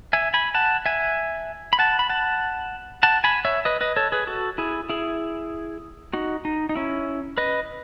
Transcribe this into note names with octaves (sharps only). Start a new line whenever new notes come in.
E5 G#5
G#5 B5
F#5 A5
E5 G#5
B5
F#5 A5
B5
F#5 A5
F#5 A5
G#5 B5
C#5 E5
B4 D#5
B4 D#5
A4 C#5
G#4 B4
F#4 A4
E4 G#4
E4 G#4
D#4 F#4
D#4
D#4
C#4 E4
B4 D#5